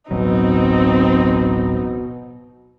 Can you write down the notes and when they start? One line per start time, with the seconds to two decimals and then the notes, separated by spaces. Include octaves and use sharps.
0.11 D1 A1 B2 F#3 C4 D#4